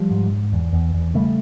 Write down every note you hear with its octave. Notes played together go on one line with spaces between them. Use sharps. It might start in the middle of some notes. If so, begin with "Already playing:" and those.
Already playing: F3 G3
G#2
G#2
E2
E2
E2
C#3 G3 A3